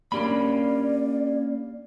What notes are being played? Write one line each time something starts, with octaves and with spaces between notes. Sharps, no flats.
A#3 C#4 D4 G4 A#4 D5 B5